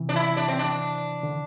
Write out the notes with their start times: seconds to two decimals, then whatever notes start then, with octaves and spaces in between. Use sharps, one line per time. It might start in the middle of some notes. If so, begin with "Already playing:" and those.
Already playing: C3 E3
0.09 D4
0.15 E4
0.37 D4
0.48 C4
0.59 D4
1.23 D3